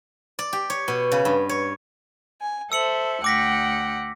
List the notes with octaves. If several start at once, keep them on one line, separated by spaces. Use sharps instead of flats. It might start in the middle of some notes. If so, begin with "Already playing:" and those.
D5
G4
C#5
B2
C#3
G2
C#5
G#5
A4 C5 E5 E6 C#7 F#7
D2 F#5 G5 D6 A#6 B6